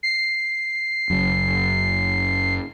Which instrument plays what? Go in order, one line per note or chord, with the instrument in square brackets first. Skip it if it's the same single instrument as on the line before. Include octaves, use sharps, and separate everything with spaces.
[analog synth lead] C7
[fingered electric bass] F#1 F#2